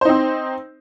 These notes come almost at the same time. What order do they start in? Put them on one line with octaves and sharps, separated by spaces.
C5 D#4 C4